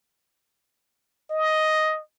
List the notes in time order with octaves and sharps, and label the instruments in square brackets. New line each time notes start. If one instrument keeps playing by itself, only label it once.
[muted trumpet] D#5